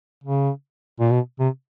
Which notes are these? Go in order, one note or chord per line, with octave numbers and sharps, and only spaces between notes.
C#3
A#2
B2
C3